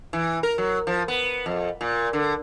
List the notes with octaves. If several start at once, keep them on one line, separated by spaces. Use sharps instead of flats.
E3
A#4
F#3
F3
B3
F2
A#2
D3